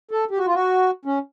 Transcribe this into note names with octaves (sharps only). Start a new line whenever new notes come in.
A4
G4
F#4
F4
F#4
C#4